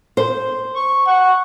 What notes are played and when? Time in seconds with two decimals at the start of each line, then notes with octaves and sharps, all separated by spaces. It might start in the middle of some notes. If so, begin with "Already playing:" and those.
0.17 C5
0.76 C#6
1.07 F#5 C#6